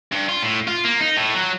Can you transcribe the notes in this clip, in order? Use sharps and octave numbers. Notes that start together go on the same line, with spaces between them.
G2
F4
A2
F4
A#3
D#4
A2
F#3